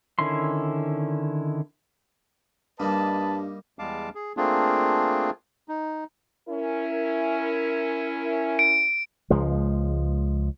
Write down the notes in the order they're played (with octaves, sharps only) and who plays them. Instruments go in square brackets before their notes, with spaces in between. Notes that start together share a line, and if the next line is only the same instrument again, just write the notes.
[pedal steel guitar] D3 D#3 C#4 E4 C6
[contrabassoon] G2 [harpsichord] G3 A#3 D#4 [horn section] B4 D#5 A5
[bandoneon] E2 G3 G#3 F5 A5 D6
G#4
A3 A#3 C4 D4 F4 G#4
D#4
[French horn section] C#4 E4 A#4
[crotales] D7
[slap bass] C#2 F3 G#3